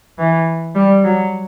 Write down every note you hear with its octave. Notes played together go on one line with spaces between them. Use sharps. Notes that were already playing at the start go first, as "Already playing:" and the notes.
E3
G3
F#3